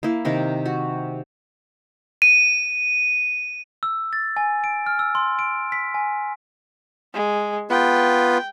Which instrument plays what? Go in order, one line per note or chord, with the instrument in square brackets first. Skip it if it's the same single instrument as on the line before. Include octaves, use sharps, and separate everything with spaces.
[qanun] A#3 E4
C3 D#3 A#4
F#4
[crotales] D#7
[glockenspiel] E6
A6
G#5
D7
F6
E6
C6
D7
B6
G#5
[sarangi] G#3
[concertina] B3 F4 B4 [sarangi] G5